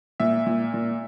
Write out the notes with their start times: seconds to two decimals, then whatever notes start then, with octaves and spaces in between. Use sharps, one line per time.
0.20 A#2 E5
0.47 A#2
0.74 A#2